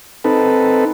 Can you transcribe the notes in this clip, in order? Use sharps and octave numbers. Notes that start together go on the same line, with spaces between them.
C4 D#4 A4 B4